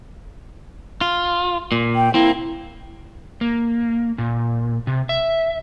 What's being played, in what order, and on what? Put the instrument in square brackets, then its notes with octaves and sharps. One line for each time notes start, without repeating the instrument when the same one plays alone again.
[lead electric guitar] F4
A#2
[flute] G5
[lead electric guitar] A#3 C4 [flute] E4
[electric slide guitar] A#3
A#2
C3
E5